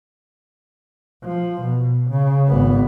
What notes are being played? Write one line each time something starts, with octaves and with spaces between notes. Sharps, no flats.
F3
B2
C#3
G#1 B3